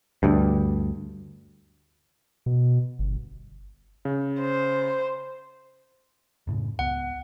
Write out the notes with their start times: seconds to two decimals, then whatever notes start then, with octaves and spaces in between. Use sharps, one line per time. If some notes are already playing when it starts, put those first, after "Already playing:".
0.23 D2 G2
2.46 B2
2.99 G1
4.05 C#3
4.41 C5
6.47 F#2 A2 C#3
6.79 C#2 B3 F#5